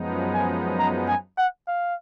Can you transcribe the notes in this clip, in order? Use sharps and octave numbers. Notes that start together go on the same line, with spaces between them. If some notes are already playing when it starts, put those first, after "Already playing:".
Already playing: F#2 F3 G#3 B3 D#4
G#5
A#5
G#5
F#5
F5